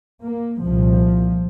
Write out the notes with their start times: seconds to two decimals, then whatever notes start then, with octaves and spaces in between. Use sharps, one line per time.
0.21 A#3
0.61 C2 A#2 F3